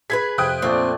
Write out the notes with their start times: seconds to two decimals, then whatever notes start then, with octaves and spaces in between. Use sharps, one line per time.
0.10 G#4 A4 B4 G#6 B6
0.38 F2 C3 G5 D#6 F#6
0.62 A#1 F2 A#2 A3 C4 D5